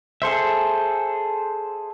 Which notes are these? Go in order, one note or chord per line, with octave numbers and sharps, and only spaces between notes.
G#4 A4 C5 E5